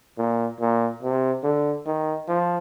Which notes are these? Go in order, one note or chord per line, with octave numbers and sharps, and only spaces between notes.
A#2
A#2
C3
D3
D#3
F3